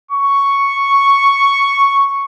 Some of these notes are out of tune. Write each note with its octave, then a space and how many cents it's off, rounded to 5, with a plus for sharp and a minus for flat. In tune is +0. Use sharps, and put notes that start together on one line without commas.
C#6 +0